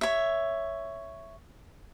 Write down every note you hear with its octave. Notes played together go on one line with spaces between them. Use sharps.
C#5 E5